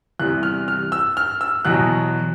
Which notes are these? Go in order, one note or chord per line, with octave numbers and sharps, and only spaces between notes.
E2 C3 E3 G3 F#6
F6
F6
E6
F6
E6
E2 B2 F#3 F#6